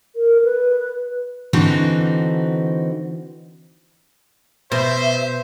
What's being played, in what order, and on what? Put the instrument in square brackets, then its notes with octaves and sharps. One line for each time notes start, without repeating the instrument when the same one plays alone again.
[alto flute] A#4
B4
[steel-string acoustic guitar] D3 E3 C4 D#4 F#4
[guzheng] B2 [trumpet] C5 [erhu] E5